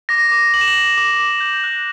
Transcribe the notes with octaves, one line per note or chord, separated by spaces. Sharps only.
D6 A#6
D6
D6 F#7
E7
F#7
D6
D6
D6
G6
F#6